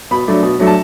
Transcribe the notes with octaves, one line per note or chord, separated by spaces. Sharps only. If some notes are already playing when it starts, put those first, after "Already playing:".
B2 B5
F#3 A3 D4
B2
F#3 A3 D4
A5